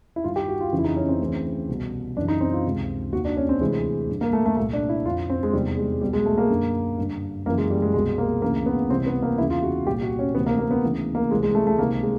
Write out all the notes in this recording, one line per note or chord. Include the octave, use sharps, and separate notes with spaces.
E4
G2 D#3 F4
G4
F#4
F4
F2 C#3 E3
E4
D#4
C#4
C4
D2 C#3 E3
C2 B2
F#2 C#3 E3 D4
D#4
C4
F4
C#2 C3 D#3
D#2 D#3 F#4
D4
C#4
C4
D2 C3 E3 G#3
G2 D3
A#3
A3
A3
C2 A#2 A3
D4
E4
F2 D3 F4
C4
G#3
E2 C3 D#3 G3
G#3
C2 B2 G3
G#3
A3
A#3
F#2 D3
G2 D3
F#2 C#3 E3 A#3
G#3
G3
G#3
C2 B2 G#3
A#3
D2 C#3 E3 A#3
B3
C2 C3 E3 C4
B3
A#3
E2 C#3 E3 E4
F4
F#4
C2 A#2 G4
F#4
C#4
D2 C3 E3 B3
A#3
A#3
B3
D2 C#3 E3
A#3
C2 C3 E3 G#3
G#3
A3
A3
C#2 C3 D#3 A#3
G#3